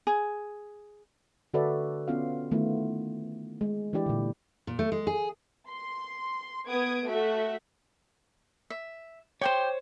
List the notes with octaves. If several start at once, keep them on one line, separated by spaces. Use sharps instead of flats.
G#4
D3 F#4 A4 B4 D5 E5
B3 C#4 F4 F5
D#3 A3 B3 E4 F4
G#3
E3 D4 E4 G4 D5
A#2 D3
A#2
A3
G#3
G#4
C6
B3 D#6 G#6 D7
A3 F#4 E5
E5
G4 C5 C#5 G5 C6